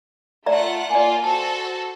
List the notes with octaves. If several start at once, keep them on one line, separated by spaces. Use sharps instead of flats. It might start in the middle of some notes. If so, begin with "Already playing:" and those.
A3 F4 D5 E5 F#5 A#5
A#3 F4 D5 G#5
F#4 A4 C5 A5